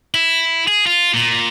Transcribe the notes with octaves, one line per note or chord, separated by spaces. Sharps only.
E4
G#4
F4
A#2